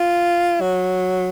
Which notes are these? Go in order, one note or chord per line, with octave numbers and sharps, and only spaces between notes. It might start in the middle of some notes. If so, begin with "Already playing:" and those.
Already playing: F4
F#3